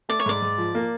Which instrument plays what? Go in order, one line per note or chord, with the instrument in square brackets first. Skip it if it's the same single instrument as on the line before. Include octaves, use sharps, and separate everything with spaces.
[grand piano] A3 [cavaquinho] D5
[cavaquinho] C#5
[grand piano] G#2 [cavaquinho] D5
[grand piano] G#2
F3
A#3